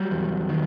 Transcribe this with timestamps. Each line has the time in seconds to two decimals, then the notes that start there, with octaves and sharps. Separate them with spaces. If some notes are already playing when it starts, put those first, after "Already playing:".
Already playing: F#3 G3
0.11 E2
0.49 D#3